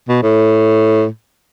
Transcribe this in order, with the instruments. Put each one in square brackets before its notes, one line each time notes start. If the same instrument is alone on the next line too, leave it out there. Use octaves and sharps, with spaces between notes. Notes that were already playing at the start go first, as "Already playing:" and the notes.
[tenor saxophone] B2
A2